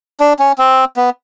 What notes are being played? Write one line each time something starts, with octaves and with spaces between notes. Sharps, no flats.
D4
C#4
C4
B3